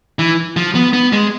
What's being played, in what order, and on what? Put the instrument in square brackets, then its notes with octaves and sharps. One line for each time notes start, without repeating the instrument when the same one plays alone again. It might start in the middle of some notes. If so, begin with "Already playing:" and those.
[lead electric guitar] E3
F3
B3
B3
G#3